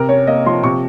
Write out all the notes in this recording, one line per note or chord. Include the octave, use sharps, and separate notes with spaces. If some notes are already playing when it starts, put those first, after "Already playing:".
Already playing: C3 A#4
C#4 C#5
A#3 D#5
F3 C6
C3 C#6